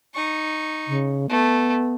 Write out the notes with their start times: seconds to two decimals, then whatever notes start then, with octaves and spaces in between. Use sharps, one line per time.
0.14 D#4 C#6
0.88 C#3
1.30 A3 B3